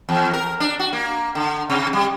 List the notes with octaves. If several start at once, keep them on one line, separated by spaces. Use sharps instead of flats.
E2
A#4
D4
F#4
A#3
D3
C3
G3